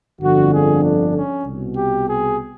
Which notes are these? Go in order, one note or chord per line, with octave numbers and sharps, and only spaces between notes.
G1 F2 D3 F3 F#4
G#4
D4
C#4
C2 B2
G4
G#4